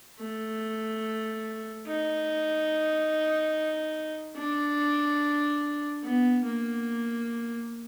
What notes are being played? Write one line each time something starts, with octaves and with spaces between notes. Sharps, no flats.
A3
D#4
D4
B3
A#3